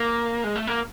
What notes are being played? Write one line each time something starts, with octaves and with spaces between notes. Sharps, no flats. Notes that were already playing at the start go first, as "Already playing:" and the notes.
Already playing: A#3
G#3
A3
A#3